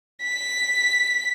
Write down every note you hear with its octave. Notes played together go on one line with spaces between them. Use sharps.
B6